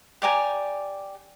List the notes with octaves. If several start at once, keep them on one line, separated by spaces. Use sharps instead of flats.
G4 D5 G#5 A#5